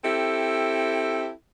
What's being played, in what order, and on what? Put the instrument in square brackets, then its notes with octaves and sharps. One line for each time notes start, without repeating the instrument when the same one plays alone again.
[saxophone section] C4 E4 G4 A4